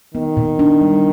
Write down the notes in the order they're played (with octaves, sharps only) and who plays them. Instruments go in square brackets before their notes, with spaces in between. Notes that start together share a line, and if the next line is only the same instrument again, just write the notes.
[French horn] D#3 [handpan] B3
[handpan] A#2
D4
G3